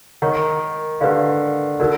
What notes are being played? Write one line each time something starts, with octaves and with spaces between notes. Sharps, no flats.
D#3 A#4 C#5 F#5 A#5 C#6
D3 G4 B4 D5 F5
D3 D#4 F#4 A#4 D5